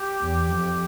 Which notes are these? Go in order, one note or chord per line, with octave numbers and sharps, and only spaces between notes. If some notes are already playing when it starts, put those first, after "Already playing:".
Already playing: G4
E2
F2